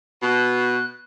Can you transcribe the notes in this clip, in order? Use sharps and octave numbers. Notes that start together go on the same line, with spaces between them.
B2 F#6